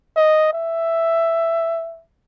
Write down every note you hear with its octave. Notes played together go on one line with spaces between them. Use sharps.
D#5
E5